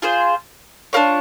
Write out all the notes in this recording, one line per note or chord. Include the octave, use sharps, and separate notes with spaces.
F4 G#4 C5
D4 F4 A#4 C#5